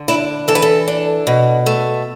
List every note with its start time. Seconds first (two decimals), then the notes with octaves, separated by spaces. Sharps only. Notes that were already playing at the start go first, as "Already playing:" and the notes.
Already playing: D3
0.08 D4 E4
0.48 E3 A4
0.55 B4
0.62 A4
0.88 D4
1.27 B2
1.66 A3